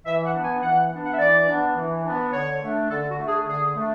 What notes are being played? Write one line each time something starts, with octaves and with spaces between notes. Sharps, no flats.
E3 E5
F#5
B3 D4
G#5
E3 F#5
B3 D4
F#5
E5
E3 D5
B3 D4
E3
B3 D4
D3 C#5
A3 D4
D3 A4
F#4
A3 D4
G#4
D3 G#4
A3 D4